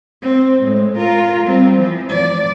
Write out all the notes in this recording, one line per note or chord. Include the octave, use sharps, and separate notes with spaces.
C4
A2 G#3
F4 A#4
G3 C4
E3 F3
D5